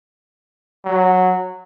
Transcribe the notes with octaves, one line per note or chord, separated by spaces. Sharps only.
F#3